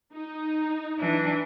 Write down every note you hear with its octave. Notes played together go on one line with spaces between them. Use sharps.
D#4
E3 D4